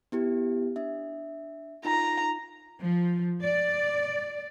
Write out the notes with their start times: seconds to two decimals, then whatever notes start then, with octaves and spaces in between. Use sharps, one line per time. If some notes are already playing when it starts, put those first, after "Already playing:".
0.12 B3 E4 G4
0.76 D4 E5
1.85 D#4 F4 A#5
2.84 F3
3.44 D5